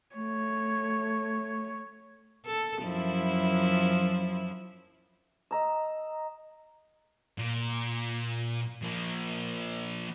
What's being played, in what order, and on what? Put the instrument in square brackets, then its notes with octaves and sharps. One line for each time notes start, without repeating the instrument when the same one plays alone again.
[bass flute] A3 [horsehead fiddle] C#5
[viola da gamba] A4
F#2 F3 E4
[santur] D#5 A#5 E6
[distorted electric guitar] A#2
F3 A#3